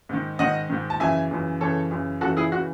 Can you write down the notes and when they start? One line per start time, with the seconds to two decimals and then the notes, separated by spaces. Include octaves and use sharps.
0.09 G#2 D#3
0.39 G#2 D#3 D#5 F#5
0.70 G#2 D#3
0.90 A5
1.00 F#2 C#3 E3 E5 G#5
1.31 F#2 C#3 E3
1.61 F#2 C#3 E3 A4 C#5
1.91 F#2 C#3 E3
2.21 F#2 C#3 E3 F#4 A4
2.37 E4 G#4
2.52 C#3 E3 F#4